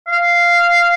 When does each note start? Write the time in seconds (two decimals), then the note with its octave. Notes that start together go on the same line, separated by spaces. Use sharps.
0.08 F5